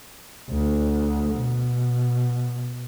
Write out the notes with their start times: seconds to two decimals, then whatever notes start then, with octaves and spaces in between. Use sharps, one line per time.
0.50 D2
1.33 B2